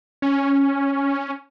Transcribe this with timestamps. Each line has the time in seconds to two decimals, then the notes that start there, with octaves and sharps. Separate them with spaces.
0.22 C#4